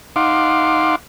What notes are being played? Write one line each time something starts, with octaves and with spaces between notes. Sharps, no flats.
D#4 F5 F#5 C6 D6